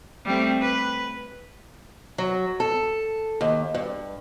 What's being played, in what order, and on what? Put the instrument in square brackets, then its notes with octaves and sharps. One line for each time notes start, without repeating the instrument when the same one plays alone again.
[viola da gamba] G3 A3 C4
B4
[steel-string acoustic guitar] F#3
A4
D#2
G2